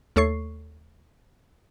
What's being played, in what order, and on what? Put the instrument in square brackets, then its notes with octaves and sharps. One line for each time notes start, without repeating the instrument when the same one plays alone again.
[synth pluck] D#2 A3 A4 C#5 C#6 C7